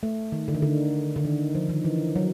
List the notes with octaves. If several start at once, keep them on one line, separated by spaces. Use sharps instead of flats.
A3
D#3
D3
D#3
D3
D3
D#3
F3
D#3
E3
F#3